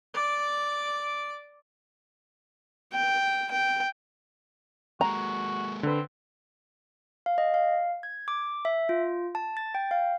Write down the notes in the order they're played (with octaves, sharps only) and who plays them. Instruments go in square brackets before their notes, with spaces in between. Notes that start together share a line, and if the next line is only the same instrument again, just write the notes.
[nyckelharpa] D5 D6
G5
G5
[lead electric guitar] G#3 A#3 [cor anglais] F#4 [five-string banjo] A#5
[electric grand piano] D3 B4 [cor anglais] C4
[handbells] F5
D#5
F5
G#6
D6
E5
F4
A5
A6
G5
F5